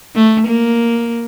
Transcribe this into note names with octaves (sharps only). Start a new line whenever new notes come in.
A3
A#3